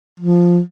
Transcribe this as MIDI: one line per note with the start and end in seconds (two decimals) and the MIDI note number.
0.20 0.60 53